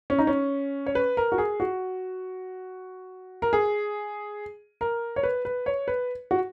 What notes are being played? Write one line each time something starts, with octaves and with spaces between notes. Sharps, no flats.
C#4
D#4
C#4
C#5
B4
A#4
F#4
G#4
F#4
A#4
G#4
A#4
C#5
B4
B4
C#5
B4
F#4